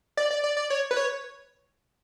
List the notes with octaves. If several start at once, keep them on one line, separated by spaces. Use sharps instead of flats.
D5
D5
D5
D5
C#5
B4
C#5